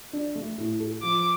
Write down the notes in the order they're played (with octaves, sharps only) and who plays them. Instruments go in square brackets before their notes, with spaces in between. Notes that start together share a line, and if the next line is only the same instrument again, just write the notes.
[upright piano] D4
A3
A2
A4
[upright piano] F3 [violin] D6